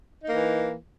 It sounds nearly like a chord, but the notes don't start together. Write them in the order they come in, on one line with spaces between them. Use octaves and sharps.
D#4 A#3 E3